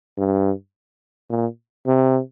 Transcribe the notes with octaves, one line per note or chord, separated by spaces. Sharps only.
G2
A#2
C3